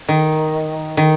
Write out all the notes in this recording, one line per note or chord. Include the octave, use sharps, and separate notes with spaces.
D#3
D#3